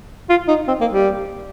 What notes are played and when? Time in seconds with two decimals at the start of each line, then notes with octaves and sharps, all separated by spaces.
0.29 F4
0.48 D#4
0.68 C4
0.81 A#3
0.93 G3